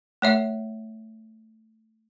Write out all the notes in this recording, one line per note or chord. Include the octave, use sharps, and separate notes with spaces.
A3 C#5 E5